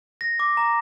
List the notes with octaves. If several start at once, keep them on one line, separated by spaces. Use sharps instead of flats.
A#6
D6
A#5